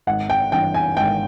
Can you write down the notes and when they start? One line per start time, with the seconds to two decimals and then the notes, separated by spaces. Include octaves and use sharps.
0.07 G#1 F#5
0.30 G5
0.52 G2 E3 G5
0.74 G#5
0.97 G#1 G5